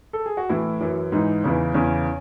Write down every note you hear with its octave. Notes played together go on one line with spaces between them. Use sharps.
A4
G#4
F#4
A2 E3 E4
F#2 E3
G#2 E3 D#4
E2 C#3 E3
E2 C#3 E3 C#4